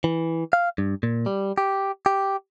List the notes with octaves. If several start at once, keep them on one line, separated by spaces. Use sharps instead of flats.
E3
F5
G2
A#2
G3
G4
G4